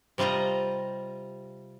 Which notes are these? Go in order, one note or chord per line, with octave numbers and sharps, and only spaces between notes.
C3 G3 F4 D#5 A#5